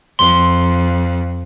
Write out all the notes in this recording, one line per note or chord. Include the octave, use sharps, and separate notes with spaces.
F2 C6